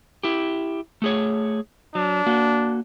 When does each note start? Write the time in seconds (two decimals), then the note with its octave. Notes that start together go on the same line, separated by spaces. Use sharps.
0.23 E4 G4
1.02 A3 G#4 C#5
1.95 F#3 D4
2.27 A#3 F#4